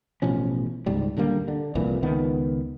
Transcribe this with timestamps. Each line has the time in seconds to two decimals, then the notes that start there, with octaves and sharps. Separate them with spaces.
0.22 A1 B2 F3 C#4
0.86 C#2 G#2 G3
1.17 D#1 D3 G3 A#3
1.48 D3
1.75 C2 F2 A#2 E3
2.03 C#2 D#3 B3